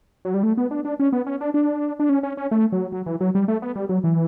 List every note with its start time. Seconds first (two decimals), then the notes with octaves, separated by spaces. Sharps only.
0.25 F#3
0.34 G3
0.43 A3
0.57 B3
0.71 D4
0.85 D4
0.99 C#4
1.12 B3
1.26 C#4
1.41 D4
1.54 D4
2.00 D4
2.09 C#4
2.23 C#4
2.37 C#4
2.51 A3
2.72 F#3
2.92 F#3
3.06 E3
3.20 F#3
3.35 G3
3.48 A3
3.62 B3
3.75 G3
3.89 F#3
4.04 E3